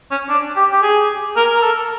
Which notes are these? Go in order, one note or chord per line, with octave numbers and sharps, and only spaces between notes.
C#4
D4
G4
G4
G#4
A#4
A#4
A4